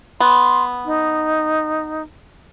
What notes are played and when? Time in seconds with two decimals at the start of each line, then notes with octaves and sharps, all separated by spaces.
0.20 B3 C6
0.85 D#4